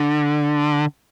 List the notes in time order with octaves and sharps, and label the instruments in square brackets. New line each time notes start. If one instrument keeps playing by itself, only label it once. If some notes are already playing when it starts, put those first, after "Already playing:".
Already playing: [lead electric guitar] D3